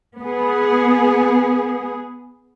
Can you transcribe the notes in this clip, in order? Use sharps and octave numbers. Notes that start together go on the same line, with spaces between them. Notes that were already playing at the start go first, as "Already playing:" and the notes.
B3 G#4